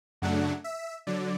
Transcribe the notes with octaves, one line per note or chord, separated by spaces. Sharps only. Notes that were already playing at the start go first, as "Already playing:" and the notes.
F#2 C#3 F#3 A3 D4 F#5
E5
D3 F#3 D5